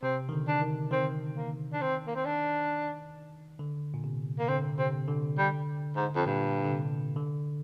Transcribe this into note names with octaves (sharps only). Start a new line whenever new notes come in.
C3 C4
D#3
D3
D4
D#3
D#3 C4
A#3
D4
C4
A#3
C4
D4
D3
A#2
C3
A#3
D3 C4
C3 C4
D3
G3
G#2
F2
G2 A#2
D3
C3
D3